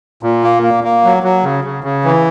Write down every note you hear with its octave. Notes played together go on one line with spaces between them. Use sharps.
A#2
A#3
A#3
A#3
F#3
F#3
C#3
C#3
C#3
E3